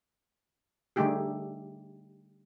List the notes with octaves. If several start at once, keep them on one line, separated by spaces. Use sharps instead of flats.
D3 G3 A3 D#4 G4 G#4